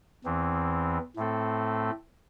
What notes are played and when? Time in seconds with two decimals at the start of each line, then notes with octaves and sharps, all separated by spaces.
0.25 E2 E3 C4
1.16 A2 A3 C4 A4